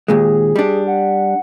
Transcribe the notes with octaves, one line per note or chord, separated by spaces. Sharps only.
D#2 A#2 G#3 G#4
G3 D4
F#5